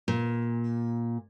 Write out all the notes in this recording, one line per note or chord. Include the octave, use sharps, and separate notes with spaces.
A#2